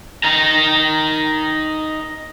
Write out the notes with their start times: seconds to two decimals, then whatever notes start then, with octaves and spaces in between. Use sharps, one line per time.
0.24 D#4 A#4